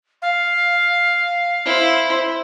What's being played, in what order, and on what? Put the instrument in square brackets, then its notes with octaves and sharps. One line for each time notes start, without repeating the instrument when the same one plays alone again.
[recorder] F5
[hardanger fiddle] E4 C5